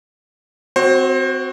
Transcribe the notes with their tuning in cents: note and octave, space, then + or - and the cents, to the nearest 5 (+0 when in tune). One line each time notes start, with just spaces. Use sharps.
C4 -20 F#4 +0 C5 +30